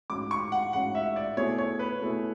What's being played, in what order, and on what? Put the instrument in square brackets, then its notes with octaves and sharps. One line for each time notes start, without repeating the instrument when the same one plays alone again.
[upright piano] A1 G#2 G#3 C#4 F#4 [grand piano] D6
[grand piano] C#6
F#5
[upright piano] A1 G#2 G#3 C#4 F#4 [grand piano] F#5
[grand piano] E5
D5
[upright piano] B2 A3 E4 G#4 [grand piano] C#5
[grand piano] C#5
B4
[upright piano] B2 A3 E4 G#4